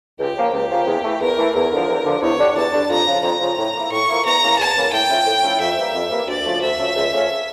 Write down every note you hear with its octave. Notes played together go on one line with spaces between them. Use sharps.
C#2 G4
C#3 F3 A#3
C#2 G4
C#3 F3 A#3
E2
E3 A3
E2 A#4
E3 A3
E2 A#4
D3 F3
E2
D3 F3
E2 C#5
D3 G3 D4
E2 A5
D3 G3 D4
F2 A#5
C#3 F3
F2 A#5
C#3 F3
A2
F3 A#3 E4
A2 C#6
F3 A#3 E4
E2 A#5
C#3 E3 A#3
E2 A5
C#3 E3 A#3
A2 G5
F3 A3 C#4 E4
A2
F3 A3 C#4 E4
F2 E5
E3 G3 A#3
F2
E3 G3 A#3
D2 D5
C#3 F3 A3
D2 E5
C#3 F3 A3
C#2
C#3 F3 A3 C#4